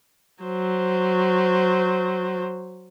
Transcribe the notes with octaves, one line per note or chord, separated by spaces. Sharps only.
F#3 C5